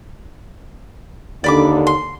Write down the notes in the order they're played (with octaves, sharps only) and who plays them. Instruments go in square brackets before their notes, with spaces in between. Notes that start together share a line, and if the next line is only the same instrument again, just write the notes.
[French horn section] D#2 D3 [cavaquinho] D5 B5 D6
[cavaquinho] C6